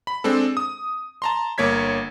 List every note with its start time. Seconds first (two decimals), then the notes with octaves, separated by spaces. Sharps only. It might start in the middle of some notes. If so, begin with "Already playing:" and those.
0.07 B5
0.24 G#3 C4 D4 A4
0.57 D#6
1.22 A5 A#5 C6
1.58 G1 A#3 C#5 G#6 B6